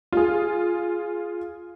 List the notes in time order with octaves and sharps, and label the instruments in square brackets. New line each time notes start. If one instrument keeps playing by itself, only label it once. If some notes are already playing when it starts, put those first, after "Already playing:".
[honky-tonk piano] F4 G#4